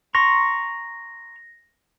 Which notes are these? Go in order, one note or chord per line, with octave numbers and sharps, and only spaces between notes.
A#5 C6 C#6 A#6